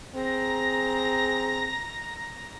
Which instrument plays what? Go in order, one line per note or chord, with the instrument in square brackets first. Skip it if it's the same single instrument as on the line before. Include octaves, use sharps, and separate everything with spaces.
[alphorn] C4 [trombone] G#4 [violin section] A#5 A#6